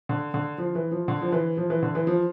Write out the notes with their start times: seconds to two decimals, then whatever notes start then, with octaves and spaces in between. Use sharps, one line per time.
0.09 D3
0.34 D3
0.58 F3
0.75 E3
0.92 F3
1.08 D3
1.22 F3
1.32 E3
1.57 F3
1.70 E3
1.83 D3
1.95 E3
2.07 F3